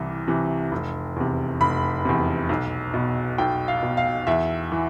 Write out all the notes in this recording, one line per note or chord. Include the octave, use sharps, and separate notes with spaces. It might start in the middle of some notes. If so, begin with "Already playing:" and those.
Already playing: C2 C3 E3
C3 E3
F1
E2 C3
F1 B5
E2 C3
B1
B2
B1 G5
F5
B2
F5
E2 E5
E3